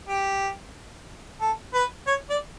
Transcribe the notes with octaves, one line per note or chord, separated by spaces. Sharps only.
G4
A4
B4
C#5
D5